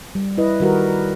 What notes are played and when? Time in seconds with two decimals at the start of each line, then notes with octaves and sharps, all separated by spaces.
0.15 G3
0.38 E4 B4 D#5
0.60 D#3 G3 F#4 G4 A#4 B4